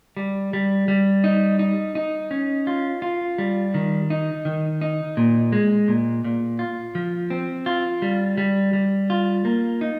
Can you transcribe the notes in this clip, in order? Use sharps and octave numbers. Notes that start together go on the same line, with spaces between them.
G3
G3
G3
D#4
D#4
D#4
C#4
F4
F4
G3
D#3
D#4
D#3
D#4
A#2
G#3
A#2
A#2
F4
F3
C4
F4
G3
G3
G3
F4
A#3
D#4